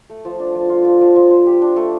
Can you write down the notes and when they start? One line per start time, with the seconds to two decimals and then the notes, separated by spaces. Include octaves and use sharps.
0.10 A3
0.25 F3
0.40 D4
0.55 F3
0.69 F4
0.85 F3
1.01 F3
1.16 F3
1.31 C5
1.46 G4
1.62 D4
1.76 A3